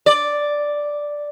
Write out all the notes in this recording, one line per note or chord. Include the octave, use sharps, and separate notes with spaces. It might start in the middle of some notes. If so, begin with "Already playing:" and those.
D5